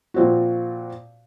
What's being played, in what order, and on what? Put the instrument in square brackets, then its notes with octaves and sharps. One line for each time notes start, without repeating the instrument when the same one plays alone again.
[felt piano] A#2 F3 C4 F#4